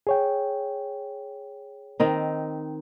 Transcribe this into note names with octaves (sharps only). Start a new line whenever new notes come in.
G#4 C#5 G5
D#3 C4 D#4